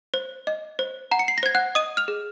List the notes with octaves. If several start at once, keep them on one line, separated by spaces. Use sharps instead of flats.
C5
D#5
C5
F#5 A#5
C#7
C7
A#6
C5 G#6
F#5 F#6
D#5 D#6 D#7
F6 F7
G#4